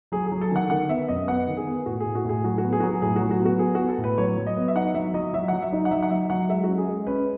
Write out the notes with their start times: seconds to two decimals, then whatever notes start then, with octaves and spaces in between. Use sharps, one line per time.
0.12 F#3 G#4
0.27 G#4
0.32 F#3
0.41 A4
0.51 D#3 F#5
0.70 D#3 F#5
0.89 B3 E5
1.08 F#2 D#5
1.28 B3 F#5
1.47 D#3
1.57 G#4
1.67 B3
1.86 A2 F#4
2.00 G#4
2.06 A2
2.15 F#4
2.25 A2 G#4
2.44 F#3 F#4
2.58 F#4
2.64 B3
2.73 G#4
2.80 F#4
2.83 F#3 G#4
3.02 A2 G#4
3.16 F#4
3.21 F#3
3.31 F#4
3.40 B3
3.45 F#4
3.59 B3 G#4
3.75 B3 F#4
3.89 A4
3.98 A2
4.04 B4
4.18 F#3 C#5
4.37 F#3
4.47 D#5
4.57 B3
4.68 E5
4.75 D#4 F#5
4.94 F#3 E5
5.14 F#3 D#5
5.33 F#3 E5
5.48 F#3 F#5
5.62 E5
5.73 D#4
5.85 F#5
5.91 F#3 E5
6.03 F#5
6.10 F#3 E5
6.30 F#3 F#5
6.49 G#3 E5
6.64 C#4 F#4
6.78 G#4
6.88 G#3
7.07 C#4 B4